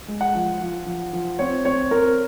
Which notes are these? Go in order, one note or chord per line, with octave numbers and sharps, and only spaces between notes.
G#3
F#5
F3
F3
F3
F3
C4 C#5
C4 C#5
C4 A#4